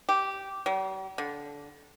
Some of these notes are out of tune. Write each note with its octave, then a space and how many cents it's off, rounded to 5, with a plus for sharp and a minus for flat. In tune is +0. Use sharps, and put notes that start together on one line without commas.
G4 -10
G3 -45
D3 -20